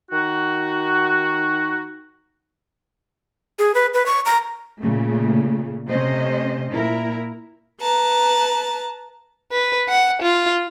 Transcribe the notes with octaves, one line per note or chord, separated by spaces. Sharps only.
D#3 D#4 F#4
G#4
B4
B4
C#6
A#5
A#2 C#3 A3
C3 A3 C#4 C5 D#5
A#2 E4 A#4
B4 A5 A#5
B4
F#5
F4